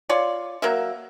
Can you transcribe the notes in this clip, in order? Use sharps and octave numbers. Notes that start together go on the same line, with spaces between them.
F4 C#5 D5
F#3 A#3 E5